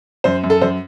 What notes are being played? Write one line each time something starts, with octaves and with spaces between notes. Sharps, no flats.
F#2 C5
F#2
A4
F#2 C5